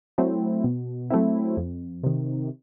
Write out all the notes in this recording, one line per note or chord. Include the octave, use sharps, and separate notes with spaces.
F#3 A3 C4 E4
B2
F#3 A3 C4 E4
F2
C3 D#3